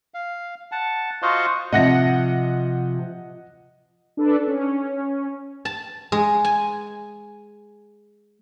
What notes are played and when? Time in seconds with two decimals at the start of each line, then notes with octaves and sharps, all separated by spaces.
0.14 F5
0.72 F#5 A5
1.22 F4 F#4 C5 D#5 F5 F#5
1.73 C3 F3 D#5 F#5 A#6
4.17 D4 A4 B4
4.47 C#4
5.65 A5
6.12 G#3
6.45 G#5